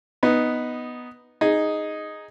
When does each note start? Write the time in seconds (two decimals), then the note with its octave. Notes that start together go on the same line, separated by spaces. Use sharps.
0.23 B3 D#4
1.41 D#4 G#4